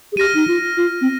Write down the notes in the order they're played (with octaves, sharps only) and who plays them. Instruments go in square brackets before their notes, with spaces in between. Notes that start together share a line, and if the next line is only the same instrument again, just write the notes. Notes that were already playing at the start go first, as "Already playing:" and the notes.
[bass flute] G#4
[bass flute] G4 [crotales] F6 A#6 D#7
[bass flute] D#4
F4
F4
C4